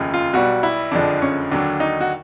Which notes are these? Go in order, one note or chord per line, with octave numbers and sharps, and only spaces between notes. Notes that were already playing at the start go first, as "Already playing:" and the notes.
Already playing: F1 D#2 C#3 F3 G#3
F4
B1 B2 G3 F#4
E4
F#1 F2 D3 F3 G#3 D4
C#4
D#2 D3 F#3 D4
D#4
F#4